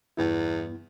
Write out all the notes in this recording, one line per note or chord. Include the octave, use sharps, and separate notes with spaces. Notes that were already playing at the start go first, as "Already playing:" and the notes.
E2 G2 B3 E4